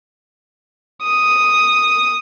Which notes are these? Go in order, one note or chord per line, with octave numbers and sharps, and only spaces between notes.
D#6